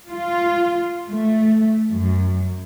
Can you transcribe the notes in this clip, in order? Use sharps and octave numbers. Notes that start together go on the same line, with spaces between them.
F4
A3
F#2